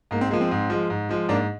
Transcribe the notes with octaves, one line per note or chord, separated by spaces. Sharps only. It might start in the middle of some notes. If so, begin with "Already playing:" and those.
G#2 A#3
C4
F3 G#3 A#3
C4
G#2
F3 G#3
G#2
F3 G#3
G#2 A#3 D4